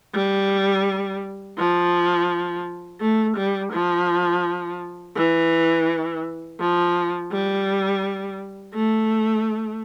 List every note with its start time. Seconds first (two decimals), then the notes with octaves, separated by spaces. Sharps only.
0.14 G3
1.58 F3
3.01 A3
3.37 G3
3.72 F3
5.16 E3
6.60 F3
7.32 G3
8.74 A3